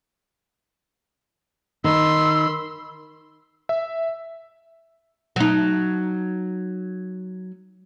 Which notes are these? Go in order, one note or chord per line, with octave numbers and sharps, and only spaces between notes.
D#3 B5 C6 E6
E5
F#3 D#4